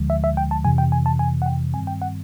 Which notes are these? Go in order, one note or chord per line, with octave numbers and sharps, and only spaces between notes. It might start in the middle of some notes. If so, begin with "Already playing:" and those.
Already playing: D2 D3 F3 G#3
E5
E5
G5
A5
F2 C3 E3 G#5
G5
G#5
A5
G#5
F#5
G5
G2 D#3 G3 C4 G#5
G5
F#5